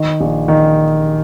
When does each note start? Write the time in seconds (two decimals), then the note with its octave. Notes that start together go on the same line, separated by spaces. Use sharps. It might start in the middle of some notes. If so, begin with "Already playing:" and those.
Already playing: D#3
0.21 A#1
0.48 D#3